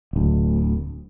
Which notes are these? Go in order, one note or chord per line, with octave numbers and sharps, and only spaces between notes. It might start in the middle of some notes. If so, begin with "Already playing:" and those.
D1 D2